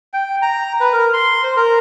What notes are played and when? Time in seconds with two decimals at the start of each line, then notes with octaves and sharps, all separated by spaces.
0.13 G5
0.42 A#5
0.80 B4
0.93 A#4
1.13 C6
1.43 C5
1.57 A#4